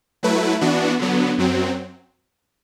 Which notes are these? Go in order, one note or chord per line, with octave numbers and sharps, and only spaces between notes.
F#3 A3 E4 B4
E3 B3 D4 F#4
D3 F#3 B3
F#2 F#3 C4